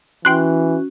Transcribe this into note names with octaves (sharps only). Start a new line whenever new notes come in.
E3 C#4 F#4 G5 C6 F#6